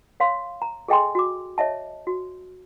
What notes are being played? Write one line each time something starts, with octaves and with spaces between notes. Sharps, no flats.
C#5 F5 C6
A#5
G#4 A4 D#5 G5 G#5 C6
F#4 D6
C#5 D#5 E5 A5
F#4